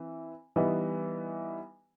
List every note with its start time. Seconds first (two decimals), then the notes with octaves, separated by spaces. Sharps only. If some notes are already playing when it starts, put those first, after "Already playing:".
Already playing: E3 C4
0.56 E3 G3 B3 D#4